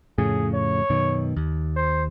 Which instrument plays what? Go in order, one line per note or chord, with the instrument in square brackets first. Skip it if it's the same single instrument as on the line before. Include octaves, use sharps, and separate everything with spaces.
[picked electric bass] F2 A2 C#3 [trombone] G#4
[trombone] C#5
[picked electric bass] F#2 B2 D#3
D#2
[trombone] C5